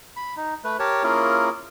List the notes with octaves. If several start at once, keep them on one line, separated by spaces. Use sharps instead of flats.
B5
D#4
A3 B4
G4 A#4 C#5 A5
A#3 C#4 E4 F4 G#4 A#4